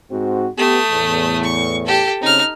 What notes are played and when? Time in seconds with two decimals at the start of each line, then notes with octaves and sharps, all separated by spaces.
0.11 G#2 C4 F#4
0.57 A3 B3 G4 D#6
0.91 E2 A2
1.44 C#6
1.87 G4 A4
2.22 C#3 C4 C#4 D#4 F6